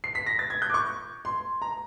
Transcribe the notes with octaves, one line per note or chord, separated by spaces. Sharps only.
C7
B6
A#6
A6
G#6
G6
D6
C#6
C6
A#5